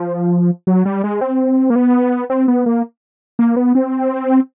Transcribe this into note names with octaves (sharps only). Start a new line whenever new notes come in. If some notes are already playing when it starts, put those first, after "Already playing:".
Already playing: F3
F#3
G3
G#3
C4
A#3
B3
C4
B3
A#3
A#3
B3
C4